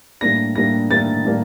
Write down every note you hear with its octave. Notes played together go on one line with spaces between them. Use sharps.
A2 G3 A#3 D4 A#6
A2 G3 A#3 D4 A#6
A2 G3 A#3 D4 A6
A2 G3 A#3 D4